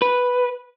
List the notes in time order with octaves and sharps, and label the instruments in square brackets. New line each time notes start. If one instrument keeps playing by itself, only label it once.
[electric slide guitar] B4